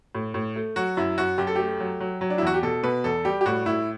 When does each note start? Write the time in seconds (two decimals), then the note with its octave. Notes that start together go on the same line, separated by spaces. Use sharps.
0.15 A2
0.34 A2
0.56 A3
0.76 F#3 F#4
0.97 F#2 E4
1.18 F#2 F#4
1.38 F#2 G4
1.47 A4
1.56 A3 G4
1.80 F#3
2.00 F#3
2.21 F#3
2.30 D4
2.38 E4
2.42 E2 F#4
2.54 G4
2.63 B2 A4
2.83 B2 B4
3.04 E2 A4
3.25 G3 G4
3.41 G4
3.46 A2 F#4
3.66 A2 E4